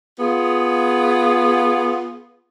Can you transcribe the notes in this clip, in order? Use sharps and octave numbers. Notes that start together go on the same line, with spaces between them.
B3 F4 G#4